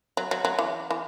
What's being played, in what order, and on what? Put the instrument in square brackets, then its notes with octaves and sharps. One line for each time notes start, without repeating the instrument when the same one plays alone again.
[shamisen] F#3
F#3
F#3
E3
E3